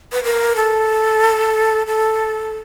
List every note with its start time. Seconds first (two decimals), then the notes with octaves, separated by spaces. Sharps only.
0.12 B4
0.24 A#4
0.56 A4
1.87 A4